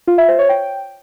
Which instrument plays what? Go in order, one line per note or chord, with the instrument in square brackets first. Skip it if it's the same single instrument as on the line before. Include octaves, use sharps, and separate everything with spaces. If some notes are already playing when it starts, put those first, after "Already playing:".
[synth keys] F4
E5
C5
C#5
G5